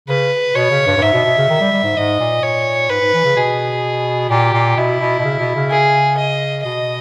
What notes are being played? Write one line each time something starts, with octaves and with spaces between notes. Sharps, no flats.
C#3 B4
B2 C#5
C#3
G2
G2
G#2 E5
B2
B2
C#3
D#3
G3
G3
G#2
G#2 D#5
A#2
A#2 C#5
G#2 B4
G#2
E3
C#3
B2 G#4
A#2 G4
A#2
B2 E4
B2
B2
C#3
B2
C#3
G#4
D#5
B2 D#5